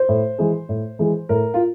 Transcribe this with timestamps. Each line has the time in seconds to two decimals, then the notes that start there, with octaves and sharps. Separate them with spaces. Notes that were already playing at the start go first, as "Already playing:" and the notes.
Already playing: C5
0.09 A2
0.38 E3 G#3
0.69 A2
0.99 E3 G#3
1.29 A2 A#4
1.54 F4